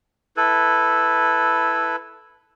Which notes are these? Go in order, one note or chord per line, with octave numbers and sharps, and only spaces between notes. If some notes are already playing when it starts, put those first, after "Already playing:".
E4 A4 B4